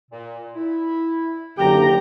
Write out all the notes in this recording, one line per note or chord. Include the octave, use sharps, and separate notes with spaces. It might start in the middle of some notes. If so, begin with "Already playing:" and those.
A#2
E4
F#1 D3 G4 G5 A#5